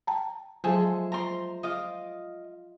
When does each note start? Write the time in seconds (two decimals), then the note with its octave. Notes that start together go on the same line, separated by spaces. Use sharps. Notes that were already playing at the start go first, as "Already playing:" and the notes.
0.07 G5 A5 A#5
0.64 F3 F#3 G#3 A3 G#4 A4
1.12 C5 A#5 C6
1.63 F4 D#5 F5 D6